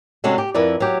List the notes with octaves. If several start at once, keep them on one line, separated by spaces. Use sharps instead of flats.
C3 G#3 C#4 D4 F#4 A4
G4
F2 E4 A#4 B4 D5
F#3 G4